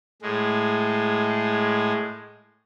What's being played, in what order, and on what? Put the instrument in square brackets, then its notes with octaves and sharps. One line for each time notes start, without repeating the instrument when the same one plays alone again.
[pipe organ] A2 G#3